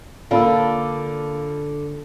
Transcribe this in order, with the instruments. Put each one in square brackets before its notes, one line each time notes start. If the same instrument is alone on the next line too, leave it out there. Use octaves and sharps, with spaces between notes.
[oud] D3 [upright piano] A#3 D4 F5 [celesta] F4 B5 E6